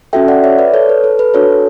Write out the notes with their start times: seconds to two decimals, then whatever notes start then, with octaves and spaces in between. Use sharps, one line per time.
0.13 C#4 F#4 A4 E5 G5
0.28 D5 F#5
0.44 C#5 E5
0.59 B4 D5
0.74 A4 C#5
0.89 B4
1.04 A4
1.19 B4
1.34 D4 F#4 A4 C#5